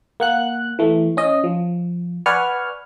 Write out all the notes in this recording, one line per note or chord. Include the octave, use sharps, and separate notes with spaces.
A#3 F#5 F#6
E3 A3
C#4 D#5
F3
B4 D5 F#5 G#5 C#6 F6